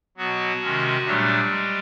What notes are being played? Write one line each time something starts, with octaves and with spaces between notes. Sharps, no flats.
B2 F#3 B3 F#4
C3 D#3 G#3 C#4
A#2 F#3 G3 A3 D4 G4
G#3